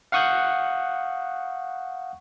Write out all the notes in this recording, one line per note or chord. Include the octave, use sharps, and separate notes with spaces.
F5 F#5 C#6 D#6 F#6 G6